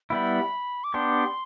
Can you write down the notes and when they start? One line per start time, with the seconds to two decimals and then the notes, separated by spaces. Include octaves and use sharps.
0.10 G3 B3 E4 B5
0.84 D6
0.94 B3 D4 G4 C6